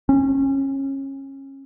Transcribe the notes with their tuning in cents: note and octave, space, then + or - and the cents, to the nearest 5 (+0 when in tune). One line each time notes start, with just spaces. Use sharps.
C#4 -25